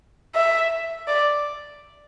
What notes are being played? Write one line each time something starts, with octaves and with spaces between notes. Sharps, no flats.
E5
D5